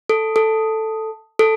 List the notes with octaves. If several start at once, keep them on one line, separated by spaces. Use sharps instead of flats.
A4
A4
A4